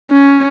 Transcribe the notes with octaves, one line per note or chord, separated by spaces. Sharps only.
C#4